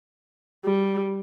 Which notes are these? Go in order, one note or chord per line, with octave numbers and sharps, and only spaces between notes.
G3